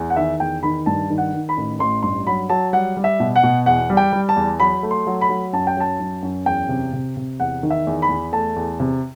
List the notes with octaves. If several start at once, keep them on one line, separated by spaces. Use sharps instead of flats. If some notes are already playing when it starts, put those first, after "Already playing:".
Already playing: E2
F#5
D#3 E5
E2 G5
D#3 B5
G2 A5
D#3
F#5
D#3
B5
A1
A1 C6
G2 C6
F#3 B5
F#3 A5
G3 F#5
G3
E5
B2
F#5
B2
E2 F#5
G3
G5
G3
A5
E2
F#3 B5
A3
C6
F#3
B5
F#3
F#2 A5
G5
F#3 A5
F#2
F#2
E2 G5
C3
C3
C3
E2 F#5
D#3
E5
E2
B5
E2
A3 A5
E2
C3